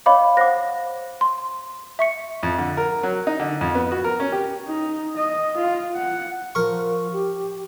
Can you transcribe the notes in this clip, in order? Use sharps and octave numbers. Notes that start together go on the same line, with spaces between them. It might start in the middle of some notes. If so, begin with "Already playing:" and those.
C#5 D#5 F5 B5 D6
C5 F#5 D6 A#6
C6
E5 C#6 C#7
F2
D3
A#4
F#3
D#4
D3
F2
B3
F#4
A#4
C#4
G4
D#4
D#5
F4
F#5
F3 A#4 C#6
G4